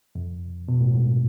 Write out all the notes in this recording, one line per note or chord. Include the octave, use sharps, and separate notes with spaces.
F2
B2
A2
G#2